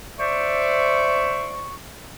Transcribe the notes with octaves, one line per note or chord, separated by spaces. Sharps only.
C5 D5 E5 C#6